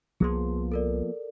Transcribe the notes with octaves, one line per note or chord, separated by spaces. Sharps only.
C2 F3 A#3 B3 G#4 C6
A4 A#4 D5